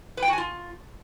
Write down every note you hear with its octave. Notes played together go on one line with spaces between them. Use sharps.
B4
G5
F#4
G#5
F4